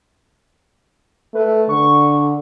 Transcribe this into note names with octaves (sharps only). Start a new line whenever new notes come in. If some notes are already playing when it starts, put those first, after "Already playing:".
A3 B4
D3 C#6